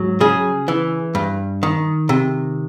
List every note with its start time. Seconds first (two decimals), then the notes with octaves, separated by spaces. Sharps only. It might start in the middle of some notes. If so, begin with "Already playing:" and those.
Already playing: G#2 F#3
0.20 C#3 G#4
0.68 E3
1.15 G2
1.63 D#3
2.09 C3